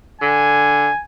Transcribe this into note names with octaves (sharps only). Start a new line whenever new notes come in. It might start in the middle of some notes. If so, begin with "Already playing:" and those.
D3 G#5